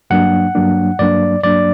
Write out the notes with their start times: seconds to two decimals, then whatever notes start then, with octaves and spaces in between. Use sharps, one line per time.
0.10 G2 F#3 A#3 D4 F#5
0.55 G2 F#3 A#3 D4
0.99 G2 F#3 A#3 D4 D5
1.43 G2 F#3 A#3 D4 D5